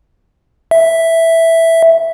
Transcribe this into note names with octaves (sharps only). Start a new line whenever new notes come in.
E5